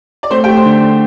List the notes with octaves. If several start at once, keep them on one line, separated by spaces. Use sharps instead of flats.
D5
A3 C4 C5
G4 G5
A3
C5 C6
D3
A3